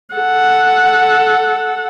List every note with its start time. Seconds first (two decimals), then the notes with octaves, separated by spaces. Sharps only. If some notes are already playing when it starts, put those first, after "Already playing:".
0.15 A4 F#5